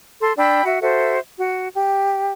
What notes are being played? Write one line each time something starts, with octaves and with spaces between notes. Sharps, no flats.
A4 C6
D4 G5 B5 E6
F#4 E5
F#4 A4 C5 E5
F#4
G4